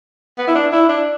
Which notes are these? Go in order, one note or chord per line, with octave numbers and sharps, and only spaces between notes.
B3
E4
D4
E4
D4